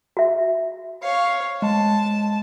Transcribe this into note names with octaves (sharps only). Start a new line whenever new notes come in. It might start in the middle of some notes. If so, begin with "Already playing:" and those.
F#4 E5
C#5 F5 C7
G#3 A5